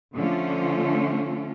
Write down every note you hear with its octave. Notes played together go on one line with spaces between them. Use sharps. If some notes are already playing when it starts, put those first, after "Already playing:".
D3 F3 A3 C#4 F4